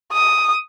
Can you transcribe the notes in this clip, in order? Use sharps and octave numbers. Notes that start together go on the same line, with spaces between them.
D#6